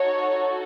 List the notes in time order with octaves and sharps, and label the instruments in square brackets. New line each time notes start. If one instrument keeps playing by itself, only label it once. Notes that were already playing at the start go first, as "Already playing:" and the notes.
Already playing: [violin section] D#4 F#4 A4 C#5